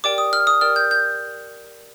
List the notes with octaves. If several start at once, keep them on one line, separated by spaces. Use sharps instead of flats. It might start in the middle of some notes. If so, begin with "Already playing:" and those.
G4 A#4 D5 G5 D6
D#6
F6
D#6
G4 A#4 D5 G5 F6
G6
G6